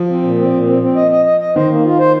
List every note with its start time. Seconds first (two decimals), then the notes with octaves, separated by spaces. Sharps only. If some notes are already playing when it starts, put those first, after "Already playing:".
Already playing: F3
0.09 C4
0.23 A#2
0.38 C4
0.53 A#2
0.67 C4
0.82 C4
0.96 D#5
1.11 D#5
1.26 D#5
1.41 D#5
1.55 D#3 C5
1.70 A#3
1.84 F4
1.99 C5